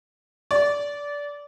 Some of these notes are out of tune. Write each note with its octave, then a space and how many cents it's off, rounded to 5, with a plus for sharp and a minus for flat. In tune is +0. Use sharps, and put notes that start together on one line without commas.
D5 -20